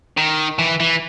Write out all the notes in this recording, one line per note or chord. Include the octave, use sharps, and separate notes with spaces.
D#3
E3
E3